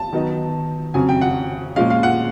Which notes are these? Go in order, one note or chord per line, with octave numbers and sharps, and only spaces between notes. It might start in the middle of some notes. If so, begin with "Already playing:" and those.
Already playing: A5
D#3 F#3 B3 D#4
F2 C#3 F#3 G#5
G5
F#5
A#2 F3 G#3 C#4 F5
F5
F#5